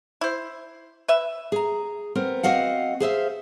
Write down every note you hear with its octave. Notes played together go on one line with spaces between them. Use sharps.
E4 C5
B4 E5
G#4 A#5
B3 C4 A#4
C4 F#4 D#5 F5 F#5
G#4 C5 E5 F5